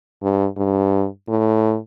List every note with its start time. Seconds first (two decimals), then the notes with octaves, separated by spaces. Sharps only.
0.22 G2
0.57 G2
1.28 A2